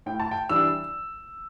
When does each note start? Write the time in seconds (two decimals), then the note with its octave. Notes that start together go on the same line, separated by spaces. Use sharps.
0.06 A2 G5
0.20 A5
0.31 G5
0.49 E3 G3 D4 E6